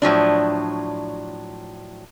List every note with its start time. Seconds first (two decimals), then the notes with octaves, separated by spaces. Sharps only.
0.02 A2 F3 F#3 D4